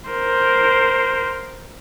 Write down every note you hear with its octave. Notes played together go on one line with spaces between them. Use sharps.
A#4 C5